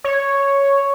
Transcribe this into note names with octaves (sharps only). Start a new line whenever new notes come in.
C#5